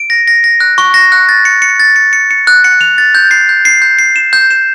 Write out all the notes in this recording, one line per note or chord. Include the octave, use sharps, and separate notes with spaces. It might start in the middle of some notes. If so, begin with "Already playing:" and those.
Already playing: D7
A#6
A#6
A#6
F#6
C#6
A#6
F#6
A6
C#7
C#7
A6
C#7
C#7
C#7
F#6
C#7
F7
A6
G6
C7
G6
C7
G6
C7
E7
G6
E7